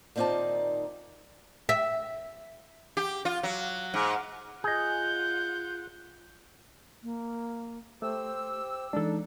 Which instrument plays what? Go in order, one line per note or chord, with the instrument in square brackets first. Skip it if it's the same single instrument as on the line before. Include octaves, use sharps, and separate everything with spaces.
[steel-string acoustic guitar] A#2 D#3 C4 D#4 D5 A5
[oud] E5
[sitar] G4
F4
F#3
G#2
[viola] F4 F#5 [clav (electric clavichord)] G#4 D#5 [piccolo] G6
[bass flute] A#3
[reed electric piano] A3 [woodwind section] G4 E6 [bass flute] C5
[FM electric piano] E3 G#3 [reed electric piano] D4 A4 [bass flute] D#4